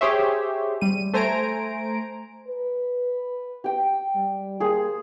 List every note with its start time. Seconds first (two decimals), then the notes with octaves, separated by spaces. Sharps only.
0.01 G4 G#4 C5 C#5 E5
0.81 G3 D#7
1.14 A3 C5 G#5 A#5 D7
2.48 B4
3.64 G4 G5
4.15 G3
4.60 A#3 G#4 C5